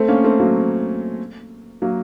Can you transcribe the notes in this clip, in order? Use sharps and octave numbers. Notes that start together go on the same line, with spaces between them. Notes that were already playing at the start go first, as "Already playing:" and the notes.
Already playing: A3 C4
A#3 C#4
A3 C4
F#3 A#3
F#3 A#3